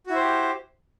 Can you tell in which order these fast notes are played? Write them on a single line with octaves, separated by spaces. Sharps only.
F#4 E4 C5 G4